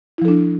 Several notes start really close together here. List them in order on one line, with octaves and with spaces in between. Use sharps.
E4 F3 A4 D4